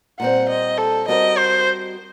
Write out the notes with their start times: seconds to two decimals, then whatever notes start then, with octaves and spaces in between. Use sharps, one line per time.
0.19 A#2 G3 C4 F#5
0.49 D#5
0.78 A4
1.08 G3 C4 F#4 A#4 D#5
1.37 C5